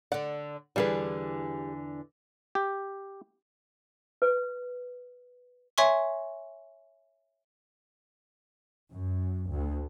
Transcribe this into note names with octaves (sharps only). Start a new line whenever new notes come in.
D3 D5 F#5
E2 D3 E3 G3 G#4 B4
G4
B4
C#5 E5 G#5 C6 C#6
F#2
D2